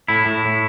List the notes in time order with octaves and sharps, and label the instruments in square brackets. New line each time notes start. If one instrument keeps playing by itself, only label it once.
[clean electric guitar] A2 E4
A2
A2